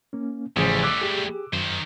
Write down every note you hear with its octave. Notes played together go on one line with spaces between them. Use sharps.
A#3 C#4
A1 A2 C#3 F3 G3 G#4 C5
D6 E6 F#6
G4 G#4
F#2 D#3 C5